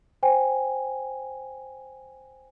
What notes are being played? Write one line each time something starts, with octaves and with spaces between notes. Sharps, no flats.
C5 G5 G#5